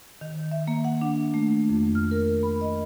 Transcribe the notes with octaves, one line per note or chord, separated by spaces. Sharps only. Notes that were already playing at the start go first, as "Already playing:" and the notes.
D#3
E5
A#3
F#5
D4
A3
F2
F6
A#4
B5
D#5